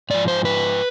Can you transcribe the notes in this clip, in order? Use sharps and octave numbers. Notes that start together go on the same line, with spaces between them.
G#2 F3 D5
C5
B4